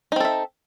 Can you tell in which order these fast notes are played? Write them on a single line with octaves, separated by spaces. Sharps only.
D#4 C4 A4 E5